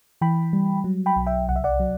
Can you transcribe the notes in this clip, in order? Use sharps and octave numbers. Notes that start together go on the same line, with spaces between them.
E3 G5 B5
G3
F#3
G5 B5
B1
E5 G5
C2 F#5
E5
D5 F#5
F#3